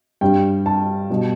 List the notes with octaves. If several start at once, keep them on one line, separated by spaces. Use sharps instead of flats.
G2 G3 G5
A5
B2 G3